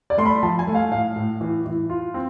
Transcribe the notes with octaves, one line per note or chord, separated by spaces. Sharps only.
D5
A3 C6
B5
F3 A5
G#5
A3
F5
A2 F5
A2
E3
E3
F4
C4